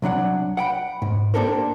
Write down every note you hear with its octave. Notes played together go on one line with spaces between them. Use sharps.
C2 F#3 D4 F#5
F#5 G5 B5
G#2
A#3 D4 G4 A4 A#4 C5